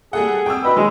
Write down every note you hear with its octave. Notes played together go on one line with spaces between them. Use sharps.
G3 G#4 A4 F#5
G5 D6 E6
D#4 F#4 B4 D#5
D#3 F#3 G#3